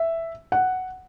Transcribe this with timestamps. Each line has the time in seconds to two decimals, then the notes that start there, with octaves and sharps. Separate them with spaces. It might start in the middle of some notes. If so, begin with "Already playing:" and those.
Already playing: E5
0.52 F#5